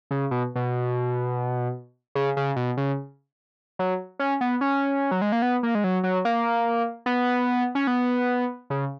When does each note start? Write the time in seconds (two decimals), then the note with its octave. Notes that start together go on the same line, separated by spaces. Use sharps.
0.11 C#3
0.31 B2
0.56 B2
2.15 C#3
2.37 C#3
2.56 B2
2.77 C#3
3.79 F#3
4.19 C#4
4.41 B3
4.61 C#4
5.11 F#3
5.22 G#3
5.32 A#3
5.42 B3
5.63 A#3
5.75 G#3
5.84 F#3
6.04 F#3
6.25 A#3
7.06 B3
7.75 C#4
7.87 B3
8.70 C#3